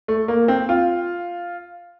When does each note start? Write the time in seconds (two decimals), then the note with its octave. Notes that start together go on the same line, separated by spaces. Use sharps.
0.08 A3
0.28 A#3
0.48 C4
0.69 F4